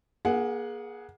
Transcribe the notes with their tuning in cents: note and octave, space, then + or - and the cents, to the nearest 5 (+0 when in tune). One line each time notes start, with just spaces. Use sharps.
A#3 +35 G#4 +5 F#5 +0